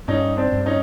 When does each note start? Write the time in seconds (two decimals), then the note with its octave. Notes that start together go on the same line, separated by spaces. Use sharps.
0.08 G2 C#4 D#4
0.37 C4 D4
0.51 G2
0.66 C#4 D#4